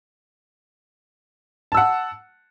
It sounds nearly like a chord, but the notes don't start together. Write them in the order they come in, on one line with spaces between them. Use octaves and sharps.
A5 E6 F#5